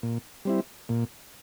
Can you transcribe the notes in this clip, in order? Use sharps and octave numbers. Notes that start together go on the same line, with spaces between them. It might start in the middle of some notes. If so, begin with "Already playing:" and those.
A#2
G3 C4 E4
A#2